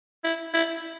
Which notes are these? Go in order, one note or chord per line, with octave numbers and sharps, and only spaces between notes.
E4
E4